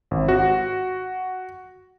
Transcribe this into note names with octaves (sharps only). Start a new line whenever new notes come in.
G#1
F#4